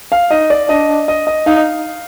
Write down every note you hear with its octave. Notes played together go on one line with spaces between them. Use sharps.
F5
D#4 D#5
D5
D4 D#5
D#5
D#5
D#4 F5